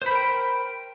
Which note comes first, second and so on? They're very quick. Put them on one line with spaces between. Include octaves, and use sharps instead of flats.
C5 B5 A#4 G5